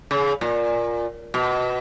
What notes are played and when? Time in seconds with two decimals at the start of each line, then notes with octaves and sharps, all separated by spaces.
0.11 C#3
0.41 A#2
1.34 B2